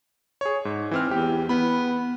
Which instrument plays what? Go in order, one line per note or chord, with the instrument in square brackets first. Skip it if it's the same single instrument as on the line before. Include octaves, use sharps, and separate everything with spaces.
[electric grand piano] G#4 C#5
G#2
E3 C4 F6
[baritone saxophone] E2 [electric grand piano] G4
[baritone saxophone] B3 [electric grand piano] B5